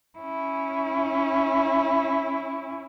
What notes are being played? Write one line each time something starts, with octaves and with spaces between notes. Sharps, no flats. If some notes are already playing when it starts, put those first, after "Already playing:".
C#4 E4